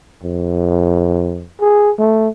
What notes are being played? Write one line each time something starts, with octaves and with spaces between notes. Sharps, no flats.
F2
G#4
A3